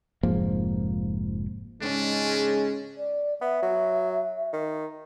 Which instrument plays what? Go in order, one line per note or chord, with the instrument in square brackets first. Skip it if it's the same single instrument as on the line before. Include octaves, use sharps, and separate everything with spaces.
[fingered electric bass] F1 G#2 F3 A#3
[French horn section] G#2 C#3 G#3 [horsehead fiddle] C#4 [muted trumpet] D4
[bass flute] D5
[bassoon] B3 [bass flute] E5
[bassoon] F#3
D#3